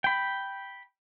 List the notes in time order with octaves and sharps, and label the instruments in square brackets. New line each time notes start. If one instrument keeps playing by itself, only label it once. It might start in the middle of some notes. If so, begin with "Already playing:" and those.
[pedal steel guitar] G5 B5